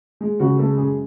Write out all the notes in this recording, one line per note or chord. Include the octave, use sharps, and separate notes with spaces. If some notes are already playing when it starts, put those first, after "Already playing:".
G#3
C#3 F#4
G#3 A4
F#2 G#4